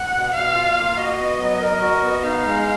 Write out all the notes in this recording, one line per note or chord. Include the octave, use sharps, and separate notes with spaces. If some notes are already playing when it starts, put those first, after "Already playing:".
Already playing: F#5
B2
B2 F5
F4
A#3
F#4 D#5
B3
F#3
A#4
F#4
B3
D#4 F5
G#3